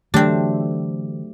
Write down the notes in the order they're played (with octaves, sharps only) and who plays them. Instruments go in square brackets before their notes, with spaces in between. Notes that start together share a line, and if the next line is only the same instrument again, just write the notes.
[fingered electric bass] D3 E3 [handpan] F#3 A3 G4 [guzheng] C4 D4